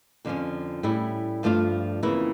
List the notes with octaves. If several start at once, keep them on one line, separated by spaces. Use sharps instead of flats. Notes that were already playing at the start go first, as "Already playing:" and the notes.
F2 D3 F3 C#4
A2 G3 C#4 E4
G2 F3 A3 D4 F4
F2 C#3 E3 A#3 E4